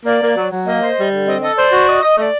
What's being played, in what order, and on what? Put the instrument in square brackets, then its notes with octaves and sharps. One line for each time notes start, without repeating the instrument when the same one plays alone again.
[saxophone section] A#3 [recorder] D5
[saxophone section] A#3
F#3
F#3
[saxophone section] A#3 [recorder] D#5
[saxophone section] C5
G3
D3
[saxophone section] C4 [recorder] D#5
[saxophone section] A4 [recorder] D#5
[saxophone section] C5 [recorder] D5
[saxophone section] F#4
D#5
D#5
[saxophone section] A3 [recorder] D5 D#5